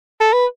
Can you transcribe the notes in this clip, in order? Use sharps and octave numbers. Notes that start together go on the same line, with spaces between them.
A4
B4